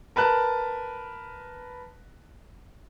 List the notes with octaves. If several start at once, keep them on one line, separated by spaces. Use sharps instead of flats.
A#4 B4 A5 F#6